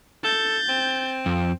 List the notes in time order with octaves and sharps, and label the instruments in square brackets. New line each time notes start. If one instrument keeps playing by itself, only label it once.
[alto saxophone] A4 [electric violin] G6 A6
[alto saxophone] C4
[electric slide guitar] F2